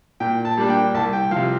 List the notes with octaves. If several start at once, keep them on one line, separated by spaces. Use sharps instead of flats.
A#2 G5
A5
G3 A#3 D4
G5
C2 A5
G5
F3 F5
C3